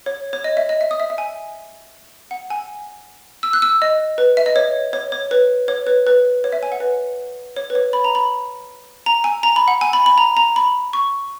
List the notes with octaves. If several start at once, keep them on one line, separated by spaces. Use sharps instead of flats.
C#5
C#5
D#5
E5
D#5
E5
D#6
E5
E5
G#5
F#5
G#5
E6
F#6
E6
D#5
B4
E5
D#5
C#5
C#5
C#5
B4
C#5
B4
B4
C#5
E5
G#5
F#5
B4
C#5
B4
C#5
B5
A#5
B5
A#5
G#5
A#5
B5
F#5
G#5
B5
B5
A#5
A#5
B5
C#6